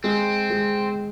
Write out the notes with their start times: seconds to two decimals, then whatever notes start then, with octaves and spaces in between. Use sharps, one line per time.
0.04 G#3 C4
0.50 G#3